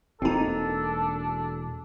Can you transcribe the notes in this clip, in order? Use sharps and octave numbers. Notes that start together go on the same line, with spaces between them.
E1 A#3 C4 D4 D#4 A4